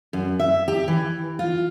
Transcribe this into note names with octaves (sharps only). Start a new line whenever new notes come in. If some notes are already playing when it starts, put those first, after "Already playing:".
F#2
E5
G4
E3
F4